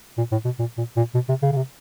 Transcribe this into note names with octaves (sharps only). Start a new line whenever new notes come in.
A#2
A2
B2
A#2
A#2
A#2
B2
C3
C#3
C#3
C3